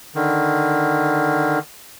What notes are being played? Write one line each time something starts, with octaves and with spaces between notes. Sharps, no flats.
D3 D#3